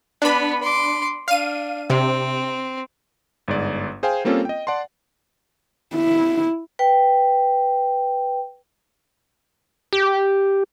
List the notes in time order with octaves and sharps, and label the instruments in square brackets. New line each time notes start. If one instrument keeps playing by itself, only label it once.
[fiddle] B3 B4 [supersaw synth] D4 B5
[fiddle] C6 D6
[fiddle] D4 [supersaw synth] F5 D#7
[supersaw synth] C3 [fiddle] C4
[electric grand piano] G1 G#2 D5
G#4 C5 F5 G5 G#5
G3 A#3 C4 C#4 F4 A4
D#5 G5
D5 F#5 A5 C6
[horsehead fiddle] E4
[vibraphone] B4 G5
[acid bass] G4